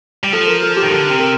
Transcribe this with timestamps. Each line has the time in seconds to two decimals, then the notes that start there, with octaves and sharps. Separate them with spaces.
0.24 G3
0.33 F3 A4
0.47 A#4
0.62 A4
0.76 G4
0.83 D#3
0.90 D3 A#4
1.10 C3
1.19 A#4